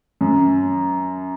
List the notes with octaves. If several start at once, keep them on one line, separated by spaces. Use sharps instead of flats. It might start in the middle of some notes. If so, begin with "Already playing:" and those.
F#2